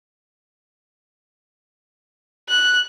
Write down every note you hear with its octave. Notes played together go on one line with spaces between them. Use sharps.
F#6